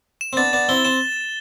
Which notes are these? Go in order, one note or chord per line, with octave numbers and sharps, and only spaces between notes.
E7
C4
B3 D4 A6
B3 D4 A6
C4 E4 G7
C4 E7